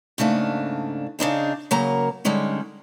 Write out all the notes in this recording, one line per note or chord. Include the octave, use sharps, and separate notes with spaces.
G#2 C#3 A3 A#3 D4
C#3 D4 D#4 G#4
C#3 F#3 A#3 A#4 A#5
D3 G3 G#3 C#4 D#4